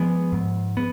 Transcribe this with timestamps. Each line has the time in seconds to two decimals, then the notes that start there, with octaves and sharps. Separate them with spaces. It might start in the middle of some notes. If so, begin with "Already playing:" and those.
Already playing: F3 G#3 B3
0.33 G#2
0.77 B3